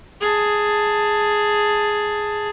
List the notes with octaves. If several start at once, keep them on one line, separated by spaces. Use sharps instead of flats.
G#4 A5